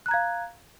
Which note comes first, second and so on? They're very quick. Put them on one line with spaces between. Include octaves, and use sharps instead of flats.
F#6 A#5 G#6 F5